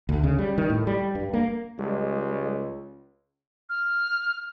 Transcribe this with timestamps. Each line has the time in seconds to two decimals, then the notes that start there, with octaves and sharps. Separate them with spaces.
0.09 D2
0.23 C#3
0.39 G3
0.58 D#3
0.70 A2
0.87 G3
1.15 G2
1.33 A#3
1.79 C#2 G3 G#3
3.69 F6